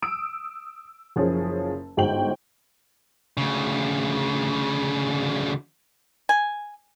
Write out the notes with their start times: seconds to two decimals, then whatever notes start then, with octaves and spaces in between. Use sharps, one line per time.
0.02 D#6 E6 D7
1.16 F#1 F3 C#4 G#4
1.97 G1 G#2 F#4 C5 G5 F#7
3.37 D2 C#3
6.29 G#5